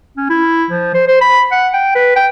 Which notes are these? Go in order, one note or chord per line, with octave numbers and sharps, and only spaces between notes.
C#4
E4
F3
C5
C5
B5
F#5
G5
B4
G5